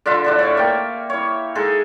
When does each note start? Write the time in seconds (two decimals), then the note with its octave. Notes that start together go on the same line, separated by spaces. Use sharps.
0.06 D3 D4 F4 E5
0.24 A2 D4 A4
0.39 C#5 D5
0.57 A#3 G5
1.10 E4 C#5
1.55 G#3 D#4 G#4 A4